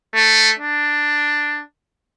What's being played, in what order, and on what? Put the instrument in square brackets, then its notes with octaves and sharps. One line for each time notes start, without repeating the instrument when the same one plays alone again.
[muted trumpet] A3
D4